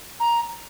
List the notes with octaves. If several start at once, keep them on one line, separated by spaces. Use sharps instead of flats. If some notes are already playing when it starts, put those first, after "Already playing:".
A#5